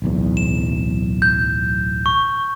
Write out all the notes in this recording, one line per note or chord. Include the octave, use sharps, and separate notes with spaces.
D1 B1 E2
E7
G6
C#6